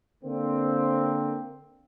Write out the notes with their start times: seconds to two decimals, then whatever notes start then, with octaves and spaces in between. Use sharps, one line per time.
0.24 D3 A#3 C4